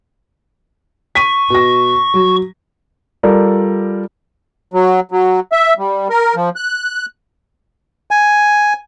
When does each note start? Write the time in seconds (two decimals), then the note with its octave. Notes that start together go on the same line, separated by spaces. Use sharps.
1.15 C#6 B6 D#7
1.50 B2 A#6
2.14 F#3
3.23 G3 F4 A4 A#4 D5
4.74 F#3
5.11 F#3
5.52 E5
5.79 G3
6.10 A#4
6.36 F3
6.56 F#6
8.11 G#5